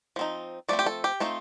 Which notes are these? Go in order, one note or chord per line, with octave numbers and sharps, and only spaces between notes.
F3 C4 D#4
F3 A3 C4 D5
G4
A4
G4
A3 C4 D#4 F4